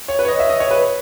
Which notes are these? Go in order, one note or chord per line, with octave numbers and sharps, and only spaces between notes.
C#5
B4
C#5
D#5
E5
D#5
C#5
B4